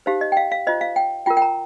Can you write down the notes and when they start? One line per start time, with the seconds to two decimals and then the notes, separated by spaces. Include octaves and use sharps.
0.06 D#4 G4 C5 F5
0.21 D#5
0.32 G5
0.37 F5
0.52 F5
0.67 F4 C5 D#5
0.81 F5
0.96 G5
1.26 F4 A#4 G5
1.37 G5
1.42 A#5